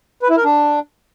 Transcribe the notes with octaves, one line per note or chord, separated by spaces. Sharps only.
B4
E4
A#4
D4